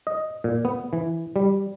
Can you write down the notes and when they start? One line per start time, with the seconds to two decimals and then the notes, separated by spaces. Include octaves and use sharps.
0.07 D#5
0.44 A#2
0.65 B3
0.93 E3
1.36 G3